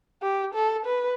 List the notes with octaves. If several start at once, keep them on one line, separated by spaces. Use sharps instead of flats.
G4
A4
B4